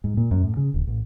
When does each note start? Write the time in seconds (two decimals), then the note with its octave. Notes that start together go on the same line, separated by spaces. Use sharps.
0.04 G#2
0.17 A#2
0.31 F#2
0.44 A2
0.57 C#3
0.74 D1
0.87 A1